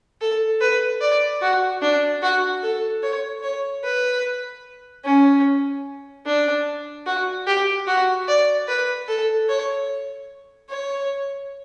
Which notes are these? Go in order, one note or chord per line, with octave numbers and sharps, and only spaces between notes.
A4
B4
D5
F#4
D4
F#4
A4
C#5
C#5
B4
C#4
D4
F#4
G4
F#4
D5
B4
A4
C#5
C#5